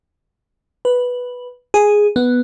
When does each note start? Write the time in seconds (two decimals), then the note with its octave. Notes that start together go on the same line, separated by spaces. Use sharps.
0.85 B4
1.74 G#4
2.16 B3